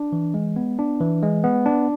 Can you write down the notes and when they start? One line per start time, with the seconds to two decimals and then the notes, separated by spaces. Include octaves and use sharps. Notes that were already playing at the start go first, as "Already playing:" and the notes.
Already playing: D4
0.12 E3
0.34 G#3
0.56 B3
0.79 D4
1.00 E3
1.22 G#3
1.44 B3
1.66 D4